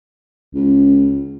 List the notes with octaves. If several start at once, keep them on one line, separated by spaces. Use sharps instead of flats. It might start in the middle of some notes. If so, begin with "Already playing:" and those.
C#2